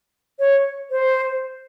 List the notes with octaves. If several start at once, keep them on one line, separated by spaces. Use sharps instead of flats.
C#5
C5